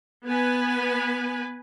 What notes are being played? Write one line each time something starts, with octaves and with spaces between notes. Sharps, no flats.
B3 B4 G#5